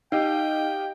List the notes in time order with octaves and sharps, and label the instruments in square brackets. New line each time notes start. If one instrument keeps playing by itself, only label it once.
[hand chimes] D#4 [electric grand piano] G4 D#5 F5 [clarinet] G5